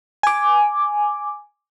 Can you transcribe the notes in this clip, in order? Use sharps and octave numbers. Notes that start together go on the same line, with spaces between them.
G#5 D6